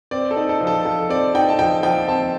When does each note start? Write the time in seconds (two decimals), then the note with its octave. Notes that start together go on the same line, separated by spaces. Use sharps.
0.11 C4 D5
0.31 A4
0.36 D#4
0.49 A4
0.60 F3
0.67 A4
0.85 F3 A4
1.09 C4 D5
1.34 D#4 G5
1.49 A5
1.59 F3 G5
1.83 F3 G5
2.08 C4 A5